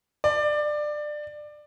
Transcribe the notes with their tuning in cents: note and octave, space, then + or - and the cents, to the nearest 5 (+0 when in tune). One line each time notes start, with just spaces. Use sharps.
D5 +20